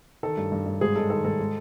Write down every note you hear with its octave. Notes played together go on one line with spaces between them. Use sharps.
D#3 A4
G2
G2
G2
G#2 G#4
G#3 A4
D#3 A4
G#2 A4
G#3